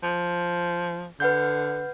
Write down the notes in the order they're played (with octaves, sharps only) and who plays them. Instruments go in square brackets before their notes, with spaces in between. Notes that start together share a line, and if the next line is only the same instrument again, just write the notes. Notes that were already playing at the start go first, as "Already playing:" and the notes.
[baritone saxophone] F3
[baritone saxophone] D3 [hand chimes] B4 F#5 G6